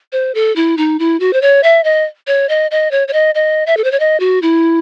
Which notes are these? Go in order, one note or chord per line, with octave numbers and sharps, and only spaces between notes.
C5
A4
E4
D#4
E4
F#4
C5
C#5
E5
D#5
C#5
D#5
D#5
C#5
C#5
D#5
D#5
E5
A4
C5
C#5
D#5
F#4
E4